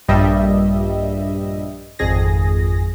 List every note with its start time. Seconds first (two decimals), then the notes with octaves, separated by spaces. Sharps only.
0.08 A#1 G2 G3 D#5 E5
1.99 G#1 F2 G#4 A#6